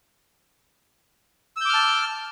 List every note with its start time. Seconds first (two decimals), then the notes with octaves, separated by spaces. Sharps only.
1.57 E6
1.61 G6
1.65 D6
1.69 F6
1.74 A5